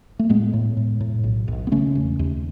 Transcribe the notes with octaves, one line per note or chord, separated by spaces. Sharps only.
A3
A2 G#3 B3
A2
A2
A2
B1
B1
B3
C#3 A3 C#4
E1
D#2